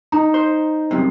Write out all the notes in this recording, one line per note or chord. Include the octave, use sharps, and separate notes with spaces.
D#4 A#5
C5
C2 F#2 C3